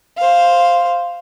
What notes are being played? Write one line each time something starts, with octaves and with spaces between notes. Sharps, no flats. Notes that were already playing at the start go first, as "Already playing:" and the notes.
C5 F5